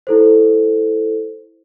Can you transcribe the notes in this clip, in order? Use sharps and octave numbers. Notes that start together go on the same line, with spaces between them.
E4 A4 C5